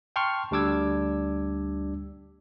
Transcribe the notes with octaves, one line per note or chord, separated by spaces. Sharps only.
G5 A5 C6 C#6 F6
D2 G3 D4 D6 E6 G#6